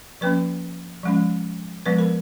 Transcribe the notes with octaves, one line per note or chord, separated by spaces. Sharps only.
F3 A#3 C#4 B4
F3 G#3 C#4
F3 G#3 B3 B4
A#4